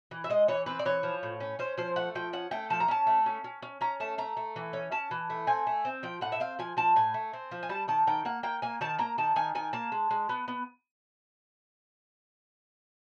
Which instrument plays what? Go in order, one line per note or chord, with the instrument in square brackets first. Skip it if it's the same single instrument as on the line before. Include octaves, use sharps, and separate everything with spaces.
[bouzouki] E3
E5
G#3 D#5
E3 C#5
C4 B4
D5
E3 C#5
F3
A2
C#4
C#4 C5
F3 C5
A3 F#5
F3 G5
C#4 F#5
A3 G5
F3 A5
A#5
C#4 A5
A3
C#4
C#4
C#4
C#4 A#5
A3 A5
A3 A#5
A3
E3
C#4
C#4 A5
E3
A3
C4 G#5
A3
C4
F3 G5
A2 F#5
E5
C4 F5
F3 G#5
F3 A5
A2 G#5
A3
C4
F3
G#5
G3 A5
D#3 A5
D#3 G5
A#3 F#5
A#3 G5
A#3 G#5
D#3 A5
A#3 A#5
D#3 A5
D#3 G#5
D#3 G#5
A#3 A5
G#3
G#3
B3
B3